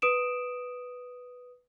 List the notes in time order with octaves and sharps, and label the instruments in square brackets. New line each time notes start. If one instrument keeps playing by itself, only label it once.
[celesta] B4 D#6 D7 E7